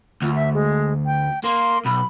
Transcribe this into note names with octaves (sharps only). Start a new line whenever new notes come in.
D2 F4
E5
G#3
G5
A#3 C6
B1 B5